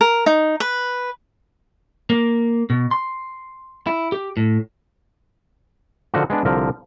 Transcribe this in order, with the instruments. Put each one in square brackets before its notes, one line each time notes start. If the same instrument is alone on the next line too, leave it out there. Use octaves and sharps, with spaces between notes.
[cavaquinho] A#4
D#4
B4
[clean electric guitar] A#3
B2
C6
E4
G4
A2
[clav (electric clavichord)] D3 D#3 F3 D#4 F#4
G#3 B3 D4
C2 D3 F3 A#4